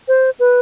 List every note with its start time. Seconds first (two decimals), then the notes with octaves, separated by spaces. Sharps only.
0.08 C5
0.40 B4